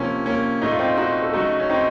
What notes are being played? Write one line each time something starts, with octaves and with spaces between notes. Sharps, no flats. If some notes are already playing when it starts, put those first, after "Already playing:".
Already playing: C3 F3 A#3 C#4
A#3 C#4
A#2 A3 D#4
F4
C4 D#4
D#4 F#4
A4
C#3 F#3 A3 D#4 F#4
C#4
C4 D#4